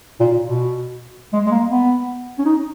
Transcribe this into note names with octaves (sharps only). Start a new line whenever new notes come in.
A#2
A#2
B2
G#3
G#3
A#3
B3
C#4
D#4